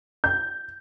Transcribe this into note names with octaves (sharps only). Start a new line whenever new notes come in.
G6